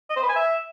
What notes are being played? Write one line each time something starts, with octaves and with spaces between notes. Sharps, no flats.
D#5
C5
B4
G#5
E5